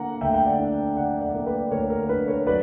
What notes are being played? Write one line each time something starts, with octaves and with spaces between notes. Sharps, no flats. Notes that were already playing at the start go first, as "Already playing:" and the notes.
Already playing: D3 A#3 F#5 A#5
D2 E5 G5
G5
D5 F#5
D4
D3 D5 F#5
D5 F#5
A#3
B4 D5
D2 A#4 C#5
A#4
D4 B4
A#4 C#5
F#3 B4 D5